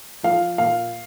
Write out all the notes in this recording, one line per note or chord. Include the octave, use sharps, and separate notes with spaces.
F3 F5
A#2 F5